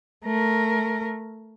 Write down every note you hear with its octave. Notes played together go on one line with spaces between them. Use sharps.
A3 A#4